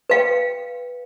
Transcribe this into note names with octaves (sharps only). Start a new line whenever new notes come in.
B4 F5 G5